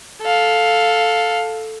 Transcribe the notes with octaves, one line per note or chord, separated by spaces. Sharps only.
A4 F5